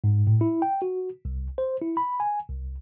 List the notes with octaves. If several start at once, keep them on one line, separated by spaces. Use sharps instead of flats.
G#2
A2
E4
G5
F#4
C2
C5
E4
B5
G#5
C2